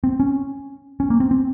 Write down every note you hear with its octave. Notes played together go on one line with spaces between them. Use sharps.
C4
C#4
C#4
A#3
C4
C4